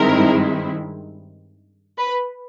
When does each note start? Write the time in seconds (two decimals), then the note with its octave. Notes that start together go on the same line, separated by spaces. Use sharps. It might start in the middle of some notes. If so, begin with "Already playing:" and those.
Already playing: G2 D#3 G#3 C4 E4 A#4
1.98 B4